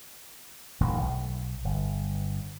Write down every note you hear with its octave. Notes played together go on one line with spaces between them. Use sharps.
D#1 A1 F#2 D#3
B1
G1